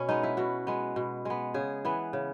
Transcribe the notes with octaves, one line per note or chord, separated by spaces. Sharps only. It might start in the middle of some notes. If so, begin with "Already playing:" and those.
Already playing: B2 C#4 C#5
G#3 B3 D#4
E4
B2 F#4
G#3 B3
B2
G#3 B3
C#3 G#4
E3 B3
C#3